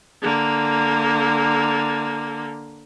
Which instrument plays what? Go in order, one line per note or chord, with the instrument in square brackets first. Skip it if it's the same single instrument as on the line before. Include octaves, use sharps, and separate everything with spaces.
[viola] D3 A#3